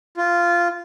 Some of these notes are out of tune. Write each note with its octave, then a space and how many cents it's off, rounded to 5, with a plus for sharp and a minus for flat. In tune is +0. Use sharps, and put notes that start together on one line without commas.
F4 -10